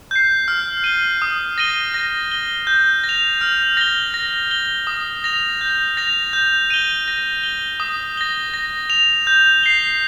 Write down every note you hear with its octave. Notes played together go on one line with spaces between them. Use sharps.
G6 C7
F6
D#7 G7
D#6
A#6 D#7 G7
A#6
G7
G6
A#6
F7
F6
A#6 G7
A#6
G7
D#6
A#6 F7
G6
A#6 F7
G6
D#7 G7
A#6
G7
D#6
A#6 G7
A#6
F7
G6
C7 G7